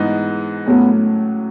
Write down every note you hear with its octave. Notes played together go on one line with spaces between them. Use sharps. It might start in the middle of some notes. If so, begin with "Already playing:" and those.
Already playing: G#2 E3 B3 D#4
A2 F#3 A3 B3 C#4